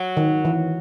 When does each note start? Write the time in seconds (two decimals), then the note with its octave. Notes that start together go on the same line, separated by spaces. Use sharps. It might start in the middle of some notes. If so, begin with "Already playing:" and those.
Already playing: F#3
0.17 D#3
0.45 E3